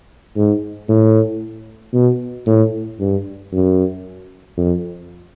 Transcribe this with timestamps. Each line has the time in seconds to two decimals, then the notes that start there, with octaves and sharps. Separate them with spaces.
0.36 G#2
0.89 A2
1.94 B2
2.47 A2
3.00 G2
3.53 F#2
4.57 F2